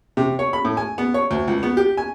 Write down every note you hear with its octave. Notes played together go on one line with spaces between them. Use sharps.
C3
C#5
B5
A2
G#5
B3
C#5
D2
C#2
B3
G4
G#5